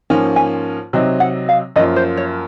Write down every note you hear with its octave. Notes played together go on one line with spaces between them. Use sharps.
G#2 F3 A#3 C#4 G#5
G#5
C3 F#3 C4 D#4
F#5
F5
F#2 F3 A#3 F4 D#5
C5
C#5